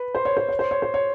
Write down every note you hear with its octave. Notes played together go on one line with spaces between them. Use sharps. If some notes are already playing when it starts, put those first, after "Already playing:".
Already playing: B4
C5
C#5
C5
C#5
C5
C#5
C5
C#5